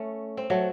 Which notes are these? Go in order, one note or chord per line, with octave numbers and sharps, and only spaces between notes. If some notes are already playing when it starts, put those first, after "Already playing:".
Already playing: A3 C#4
C4
F#3 A3